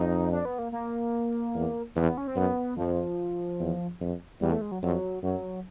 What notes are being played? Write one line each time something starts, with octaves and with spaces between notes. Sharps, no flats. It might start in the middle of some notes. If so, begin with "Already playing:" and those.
Already playing: F2 D#4
D4
B3
A#3
A#3
E2
E2 B3
C#4
C4
F#2 B3
F2 F3
E2
F2
E2 G3
A3
G#3
F#3
F2 F#3
F#2 F#3